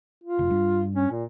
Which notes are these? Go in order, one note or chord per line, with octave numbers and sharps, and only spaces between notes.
F4
F1
G2
C#4
A#2